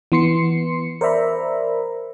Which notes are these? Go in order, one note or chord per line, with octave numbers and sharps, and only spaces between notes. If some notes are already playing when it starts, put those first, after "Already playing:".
E3 B3 C6 C7 C#7
A#4 C5 D5 E5 A#5 B5